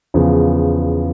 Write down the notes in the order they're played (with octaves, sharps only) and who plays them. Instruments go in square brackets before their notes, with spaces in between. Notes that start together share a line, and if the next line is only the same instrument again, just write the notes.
[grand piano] E2 C#3 F3